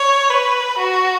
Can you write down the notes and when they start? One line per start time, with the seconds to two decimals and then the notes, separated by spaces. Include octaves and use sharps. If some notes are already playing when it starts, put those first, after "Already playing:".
Already playing: C#5
0.30 B4
0.78 F#4